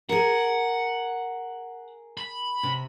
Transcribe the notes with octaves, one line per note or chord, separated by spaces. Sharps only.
G#4 A#4 F#5
B5
C3